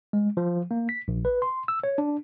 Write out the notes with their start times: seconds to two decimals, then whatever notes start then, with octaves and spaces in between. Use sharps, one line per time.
0.13 G#3
0.37 F3
0.71 A#3
0.89 B6
1.08 A#1
1.25 B4
1.42 C6
1.68 E6
1.83 C#5
1.98 D4